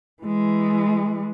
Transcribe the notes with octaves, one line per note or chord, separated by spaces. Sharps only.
E3 G#3